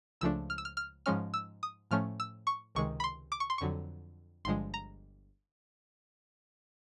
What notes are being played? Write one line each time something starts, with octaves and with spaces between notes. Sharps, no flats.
C#2 C#3 F3 A3 D4 E6
F6
E6
F6
F6
G#2 F3 G#3 C#4 F6
E6
D#6
A2 F3 A3 C#4 F6
E6
C#6
C#2 C3 D#3 G#3 C#6
B5
C6
D6
C#6
C6
F2 D3 F#3 C#6
G1 G2 D3 F3 G#3 C6
A#5